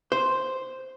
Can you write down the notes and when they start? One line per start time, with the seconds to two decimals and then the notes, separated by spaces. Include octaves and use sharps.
0.12 C5